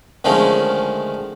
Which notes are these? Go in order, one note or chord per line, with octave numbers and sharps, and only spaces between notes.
D2 D#3 F3 G#3 A3 C#4